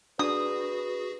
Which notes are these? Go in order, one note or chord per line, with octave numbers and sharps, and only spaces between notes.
D4 F#4 G#4 B4 D#6